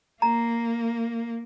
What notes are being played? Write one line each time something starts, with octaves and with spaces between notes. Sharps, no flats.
A#3 A#5